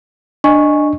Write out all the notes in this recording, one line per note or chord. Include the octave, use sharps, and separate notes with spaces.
D4 D#5 G#5 C#6